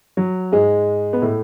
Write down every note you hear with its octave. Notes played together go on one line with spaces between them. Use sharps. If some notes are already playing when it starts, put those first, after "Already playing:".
F#3
G#2 G#3
B3
A2 A3